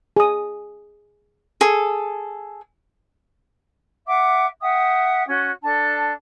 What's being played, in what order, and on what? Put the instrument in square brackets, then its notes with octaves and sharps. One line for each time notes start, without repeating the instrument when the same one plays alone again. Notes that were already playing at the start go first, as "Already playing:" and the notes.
[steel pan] G#4 D#6
[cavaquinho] G#4 A4
[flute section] E5 F#5 D6
E5 F#5 G5 D#6
C#4 F#4
D4 A4 A5